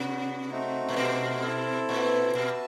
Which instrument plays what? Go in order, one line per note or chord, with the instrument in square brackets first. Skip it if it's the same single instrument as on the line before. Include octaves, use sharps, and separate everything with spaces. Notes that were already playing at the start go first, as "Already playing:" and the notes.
Already playing: [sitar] C3 [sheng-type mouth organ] B3 D4 F#4
[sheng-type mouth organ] A3 C4 D#4 F#4
[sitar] A#2
B2
[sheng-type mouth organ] C4 E4 A4
[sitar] A#2
[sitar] B2 [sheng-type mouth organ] F#4 B4 E5 A5